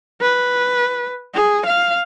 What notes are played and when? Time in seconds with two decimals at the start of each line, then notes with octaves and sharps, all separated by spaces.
0.21 B4
1.34 G#4
1.66 F5